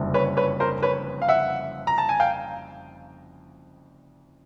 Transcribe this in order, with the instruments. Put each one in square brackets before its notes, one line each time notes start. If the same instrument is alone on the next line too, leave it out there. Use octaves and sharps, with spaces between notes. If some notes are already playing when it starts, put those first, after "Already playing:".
Already playing: [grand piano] F#1 F2 D3 G3
[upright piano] B4 C#5
B4 C#5
A#4 C5
B4 C#5
F5
E5 F#5
A#5
A5
G#5
F5 G5